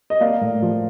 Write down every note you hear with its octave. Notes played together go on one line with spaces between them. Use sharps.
D#5
A#3 D5 F5
A2
F3